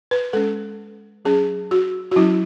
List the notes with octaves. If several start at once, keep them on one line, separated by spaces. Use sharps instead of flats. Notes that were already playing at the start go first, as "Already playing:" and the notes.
B4
G#3 C#4 A4
F#3 C#4 G#4
F#4
F#4
F#3 C#4 E4